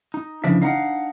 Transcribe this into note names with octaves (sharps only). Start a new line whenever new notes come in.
D#4
C#3 E3 F3 D4 E5
D4 D#4 F5 F#5 A#5